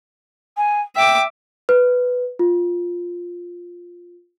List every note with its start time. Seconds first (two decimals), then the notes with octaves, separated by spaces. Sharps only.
0.57 G#5
0.96 E5 G5 D6
1.69 B4
2.39 F4